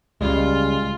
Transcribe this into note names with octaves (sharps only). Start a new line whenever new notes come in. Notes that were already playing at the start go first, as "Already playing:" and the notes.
C#2 C#3 G3 G#3 F4